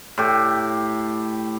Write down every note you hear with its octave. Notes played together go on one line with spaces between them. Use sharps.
A2 G4